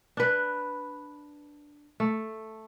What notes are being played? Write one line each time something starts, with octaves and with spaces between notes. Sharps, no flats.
D4 B4
A3